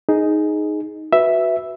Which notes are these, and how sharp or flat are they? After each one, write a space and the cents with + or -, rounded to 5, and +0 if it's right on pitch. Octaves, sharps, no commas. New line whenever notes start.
D#4 +0 G#4 +5
F#4 +0 B4 +0 E5 +0